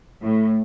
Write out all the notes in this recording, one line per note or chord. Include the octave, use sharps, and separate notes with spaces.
A2